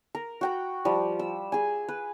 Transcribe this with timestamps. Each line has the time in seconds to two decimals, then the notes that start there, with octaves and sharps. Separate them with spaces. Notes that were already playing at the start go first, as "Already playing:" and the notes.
0.15 A#4
0.41 F#4 G5 B5
0.85 F3 G3
1.19 E6
1.52 G#4 G#5
1.88 B4